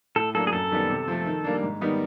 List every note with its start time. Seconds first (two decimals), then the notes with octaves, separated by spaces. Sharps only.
0.16 A2 A4
0.35 F#3 A#3 D4 A4
0.47 G#4
0.52 F#2 A4
0.71 D#3 G3 B3
0.89 C3
1.08 F3 A3
1.26 D#3
1.44 G3 A#3 D4
1.63 G#2
1.81 D#3 G3 B3 D#4